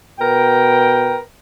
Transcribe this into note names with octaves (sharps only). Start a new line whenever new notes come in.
B2 A#4 B4 G5